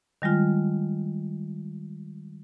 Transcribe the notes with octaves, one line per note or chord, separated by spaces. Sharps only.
D#3 G3 G#3 F4